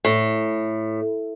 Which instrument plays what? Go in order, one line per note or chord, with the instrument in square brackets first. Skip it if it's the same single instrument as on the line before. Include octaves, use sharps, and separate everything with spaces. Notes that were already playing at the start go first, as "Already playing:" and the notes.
[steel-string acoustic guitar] A2